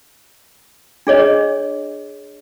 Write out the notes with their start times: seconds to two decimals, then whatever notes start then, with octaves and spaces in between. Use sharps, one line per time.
1.07 D4 G#4 C#5 D#5